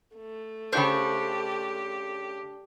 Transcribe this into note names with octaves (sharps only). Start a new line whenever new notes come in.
A3
C#3 D4 F4 G4 C5 C#6 G6